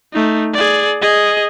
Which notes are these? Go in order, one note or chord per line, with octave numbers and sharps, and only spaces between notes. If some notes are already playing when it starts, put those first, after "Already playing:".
A3 D#4
G#4 D5
G#4 D#5